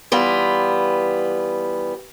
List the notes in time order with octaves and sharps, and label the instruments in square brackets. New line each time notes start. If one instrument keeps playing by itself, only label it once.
[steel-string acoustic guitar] E3 G3 B3 F4